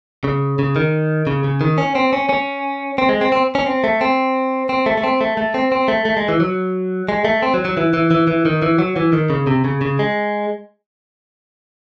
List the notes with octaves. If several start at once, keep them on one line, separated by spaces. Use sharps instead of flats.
C#3
C#3
D#3
C#3
C#3
D#3
C#4
C4
C#4
C#4
C4
G#3
C4
C4
C#4
C4
A3
C4
C4
A3
A3
C4
A3
A3
C4
C4
A3
A3
G#3
E3
F#3
G#3
A3
C4
F#3
F#3
E3
E3
E3
E3
D#3
E3
F#3
E3
D#3
C#3
C3
C#3
C#3
G#3